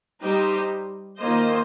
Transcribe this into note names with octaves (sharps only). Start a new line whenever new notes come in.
G3 D#4 G4 C5 D#5
D#3 A#3 F4 C5 D#5